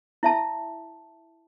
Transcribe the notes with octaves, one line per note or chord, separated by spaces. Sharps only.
E4 E5 A5